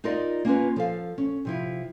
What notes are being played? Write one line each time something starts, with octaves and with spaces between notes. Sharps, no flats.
D#4 F4 A#4 D5 D#5
A#3 C#4 F4 B4
F3 A4 F5
C#4
C3 F3 E4